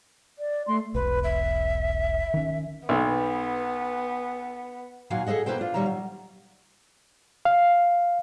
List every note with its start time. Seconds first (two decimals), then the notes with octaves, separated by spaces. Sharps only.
0.39 D5
0.68 A3 C6
0.95 E1 B1 B4
1.24 E5
2.34 D#3 C#4
2.89 B1 B3
5.10 D#2 A#2 F#3 F#4 F5 G#5
5.26 G#4 A4 C5 D#5 F#5
5.46 B2 A#3 E4 B4 C5 G5
5.58 D4 F4
5.74 A#2 D#3 G3 C#5 E5 A#5
5.86 F#3
7.45 F5